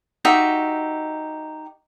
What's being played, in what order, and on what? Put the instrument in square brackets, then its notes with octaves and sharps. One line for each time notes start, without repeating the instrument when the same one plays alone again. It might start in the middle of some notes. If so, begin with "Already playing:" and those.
[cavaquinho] D#4 F#4 G4 E5